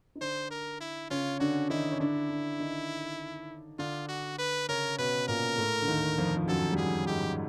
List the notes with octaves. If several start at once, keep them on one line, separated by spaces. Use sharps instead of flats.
D#4
D3 D4 C5
A#4
E4
C#3 C#4 F4
D3 D4 F#4
D#3 D#4 E4
C#4
D3 D4 E4
D3 D4
D#3 D#4
D3 D4 F4
F#4
B4
C#3 C#4 A#4
B2 B3 B4
A#2 A#3 A#4
A2 A3
D3
D#2 D#3
F2 F3
F3
F#2 F#3 A4
G3
F#2 F#3 G#4
G#2 G#3 G4